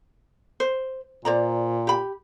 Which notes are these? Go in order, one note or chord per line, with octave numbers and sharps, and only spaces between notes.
C5
A#2 C5 D5 A#5
G4 B5